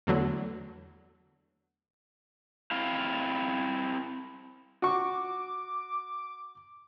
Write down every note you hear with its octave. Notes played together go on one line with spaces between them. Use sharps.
E2 D3 F#3 A3
C4 E4 F5
F#4 C#6 D6